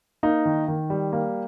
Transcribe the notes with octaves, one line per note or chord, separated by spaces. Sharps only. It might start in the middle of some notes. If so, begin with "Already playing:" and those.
A#3 D#4
D#3
D#3
G3
A#3